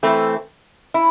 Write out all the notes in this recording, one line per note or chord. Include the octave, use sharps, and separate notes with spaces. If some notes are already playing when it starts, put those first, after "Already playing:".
E3 A3 C4
E4